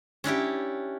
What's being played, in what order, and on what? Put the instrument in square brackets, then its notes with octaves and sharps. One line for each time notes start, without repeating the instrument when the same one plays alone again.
[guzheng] C#4 D4 E4 G4